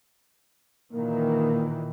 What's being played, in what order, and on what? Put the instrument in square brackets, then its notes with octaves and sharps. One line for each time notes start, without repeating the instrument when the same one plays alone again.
[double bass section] A#2 D#3 E3 [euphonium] A#3